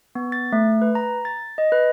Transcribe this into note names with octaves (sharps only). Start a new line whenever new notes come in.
B3
A6
A3
B4
A#5
A6
D#5
B4